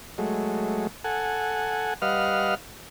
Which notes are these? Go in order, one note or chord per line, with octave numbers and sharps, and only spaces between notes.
F#3 G#3 A3
A4 F#5 G#5
G3 B4 D#5 F5 F#5 F6